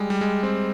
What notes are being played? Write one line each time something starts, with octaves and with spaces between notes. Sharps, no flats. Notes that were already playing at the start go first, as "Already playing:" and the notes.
Already playing: G3 G#3
G3
G#3
C4